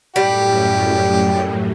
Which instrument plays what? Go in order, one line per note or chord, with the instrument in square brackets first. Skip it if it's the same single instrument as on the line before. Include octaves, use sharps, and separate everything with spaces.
[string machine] F#2 A2 [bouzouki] G3 [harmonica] G4